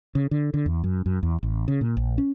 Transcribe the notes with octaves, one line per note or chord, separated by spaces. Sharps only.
C#3
D3
D3
E2
F#2
F#2
E2
A1
C#3
A#2
A#1
C#4